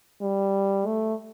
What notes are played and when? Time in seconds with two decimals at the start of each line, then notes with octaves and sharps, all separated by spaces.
0.21 G3
0.86 A3